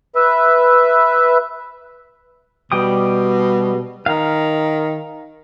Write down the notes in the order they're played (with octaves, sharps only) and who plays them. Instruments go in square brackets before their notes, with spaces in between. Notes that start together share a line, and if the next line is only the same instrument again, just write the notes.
[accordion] B4 E5
[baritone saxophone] B2 [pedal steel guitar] G3 G5 D#6
[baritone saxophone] D#3 [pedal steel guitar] F5 A#5